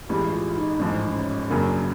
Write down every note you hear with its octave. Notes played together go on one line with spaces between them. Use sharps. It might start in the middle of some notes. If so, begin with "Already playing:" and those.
A1 G2 E3 G#3 G4
F4
D#4
A1 G#2 F3 D4
D4
C#4
F#1 F#2 C#3 F#3 D4